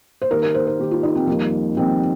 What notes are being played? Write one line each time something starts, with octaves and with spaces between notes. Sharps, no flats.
C5
D#3 A#3 G4 A#4
A#4
C5
A#4
D#3 A#3 G4
F4
D#4
C4
F2 D#3 G3 A#3 D#4
F2 D#3 G3 C4 D#4